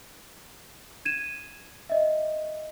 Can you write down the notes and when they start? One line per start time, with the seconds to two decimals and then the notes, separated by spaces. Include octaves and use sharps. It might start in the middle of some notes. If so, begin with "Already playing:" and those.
1.05 G#6 D#7 E7
1.90 D#5 E5